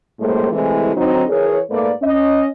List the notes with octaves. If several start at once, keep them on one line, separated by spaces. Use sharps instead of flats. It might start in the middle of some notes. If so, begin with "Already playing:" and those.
F#2 A2 G3 G#3 A#3 C5
C3 E3 G#3 A3 C4 E4
D3 F#3 C4 D#4
E3 G#4 A#4 C#5
G#2 A3 A#3 B4 D5
C#4 D#5